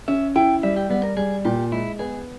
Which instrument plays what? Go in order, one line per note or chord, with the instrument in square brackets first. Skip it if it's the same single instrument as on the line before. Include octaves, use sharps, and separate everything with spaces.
[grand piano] C#4 [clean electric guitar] E5
[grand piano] E4 [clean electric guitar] G5
[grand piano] G3 [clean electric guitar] E5
[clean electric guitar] G4
[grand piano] G3 [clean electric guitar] B3
[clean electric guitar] A#4
[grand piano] G3 [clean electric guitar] G#4
[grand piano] A#2 [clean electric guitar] G4
[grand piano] G#3 [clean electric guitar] E4
[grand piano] B3 [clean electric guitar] G#4